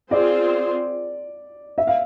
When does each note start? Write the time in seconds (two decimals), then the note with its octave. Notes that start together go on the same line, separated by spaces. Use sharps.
0.11 C4 F4 G#4 C5 D5
1.78 E5
1.87 F5